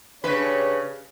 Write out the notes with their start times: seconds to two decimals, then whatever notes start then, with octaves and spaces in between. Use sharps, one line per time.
0.24 C#3 D4 G4 B4 C#5